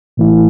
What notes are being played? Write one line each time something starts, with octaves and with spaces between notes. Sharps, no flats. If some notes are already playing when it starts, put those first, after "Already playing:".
A2 E3 A3 E4